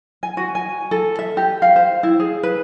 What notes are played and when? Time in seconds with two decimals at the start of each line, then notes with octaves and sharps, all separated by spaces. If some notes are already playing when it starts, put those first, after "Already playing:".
0.23 G#5
0.37 F#4
0.55 G#5
0.91 A4
1.19 E5
1.37 G4
1.62 F5
1.76 C5
2.03 E4
2.20 G#4
2.43 B4